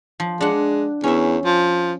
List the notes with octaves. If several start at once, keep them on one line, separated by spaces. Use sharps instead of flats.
F3
G#3 D4 F#5
E2 C#4 E5
F3